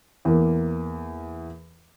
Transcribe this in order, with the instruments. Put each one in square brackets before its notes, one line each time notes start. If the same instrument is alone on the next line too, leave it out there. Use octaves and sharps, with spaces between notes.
[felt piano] E2 A#3